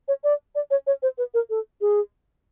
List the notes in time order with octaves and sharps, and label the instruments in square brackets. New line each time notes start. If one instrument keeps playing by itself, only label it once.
[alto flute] C#5
D5
D5
C#5
C#5
C5
B4
A#4
A4
G#4